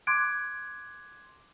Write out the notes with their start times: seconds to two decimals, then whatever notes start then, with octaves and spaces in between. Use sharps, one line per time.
0.07 C6 D6 F#6 G#6 D7